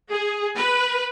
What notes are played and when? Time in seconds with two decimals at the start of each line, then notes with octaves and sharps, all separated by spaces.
0.10 G#4
0.55 B4